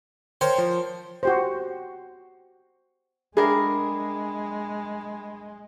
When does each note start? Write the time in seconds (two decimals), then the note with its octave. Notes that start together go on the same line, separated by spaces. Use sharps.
0.41 A#4 C5 C#5 G5
0.58 F3
1.23 F#4 G4 C5
3.37 G#3 D4 G#4 A#4 E5 G5 B5